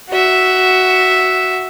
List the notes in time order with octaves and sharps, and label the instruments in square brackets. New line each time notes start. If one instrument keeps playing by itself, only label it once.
[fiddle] F#4 E5